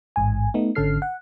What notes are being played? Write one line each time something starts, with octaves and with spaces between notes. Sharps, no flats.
A1 G#2 G#5
A3 B3 D#4
G#1 D3 C#4 A4 F6 C7
F#5